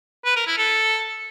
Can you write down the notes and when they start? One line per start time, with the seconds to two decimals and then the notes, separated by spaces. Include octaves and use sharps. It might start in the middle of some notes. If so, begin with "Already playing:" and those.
0.25 B4
0.36 A#4
0.47 E4
0.58 A4